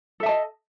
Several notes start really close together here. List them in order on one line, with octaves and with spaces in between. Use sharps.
A4 E5 A5 D#5